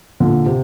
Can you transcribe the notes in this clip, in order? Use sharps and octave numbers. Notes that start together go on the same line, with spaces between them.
A#2 D3
C3